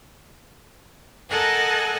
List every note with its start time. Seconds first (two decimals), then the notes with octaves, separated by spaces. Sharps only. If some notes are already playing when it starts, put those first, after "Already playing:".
1.29 A4 A#4 D#5 F#5 G#5 A5